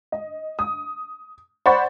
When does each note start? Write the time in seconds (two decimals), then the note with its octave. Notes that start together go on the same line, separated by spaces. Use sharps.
0.12 D#5
0.59 D#6
1.66 C5 D5 F#5 B5 C#6 A6